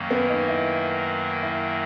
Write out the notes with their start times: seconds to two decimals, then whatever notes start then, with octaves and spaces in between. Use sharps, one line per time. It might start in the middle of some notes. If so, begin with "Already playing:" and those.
Already playing: F#2 D#3 F#3 A#3
0.11 B3
0.29 D#4
0.48 E4
1.43 E4